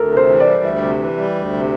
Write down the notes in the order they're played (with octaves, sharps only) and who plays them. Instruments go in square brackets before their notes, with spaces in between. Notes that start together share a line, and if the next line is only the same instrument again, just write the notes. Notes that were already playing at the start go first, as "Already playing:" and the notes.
Already playing: [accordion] D2 [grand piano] A4 A#4
[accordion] C3 [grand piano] A#4
[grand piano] C5
[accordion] E3
[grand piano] D5
[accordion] G3
[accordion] D2 [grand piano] E5
[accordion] C3
E3
G3
D2
C3